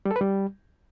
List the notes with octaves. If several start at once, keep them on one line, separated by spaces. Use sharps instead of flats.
G3
A4
B4
G3